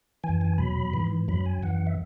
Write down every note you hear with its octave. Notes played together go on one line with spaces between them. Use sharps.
E3 G#5
F#2
G#5
E2 B2 F#3 B5
G#2 E3
F#2 F#3 B5
G#5
F#2 E3 F#5
F#5
E5